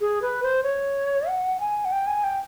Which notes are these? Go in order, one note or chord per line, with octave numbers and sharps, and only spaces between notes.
G#4
B4
C5
C#5
F#5
G#5
F#5
G5
G#5
G5